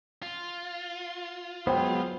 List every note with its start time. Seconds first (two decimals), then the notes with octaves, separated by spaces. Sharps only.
0.22 F4
1.67 F#3 G#3 B3 C5 G5